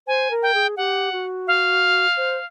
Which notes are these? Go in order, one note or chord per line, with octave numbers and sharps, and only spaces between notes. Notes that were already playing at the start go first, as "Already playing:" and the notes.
C5 G#5
A#4
G5
G#4
G4 F#5
F#4
F5
C5